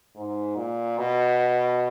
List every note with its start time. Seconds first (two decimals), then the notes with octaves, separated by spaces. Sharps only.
0.16 G#2
0.56 A#2
0.98 B2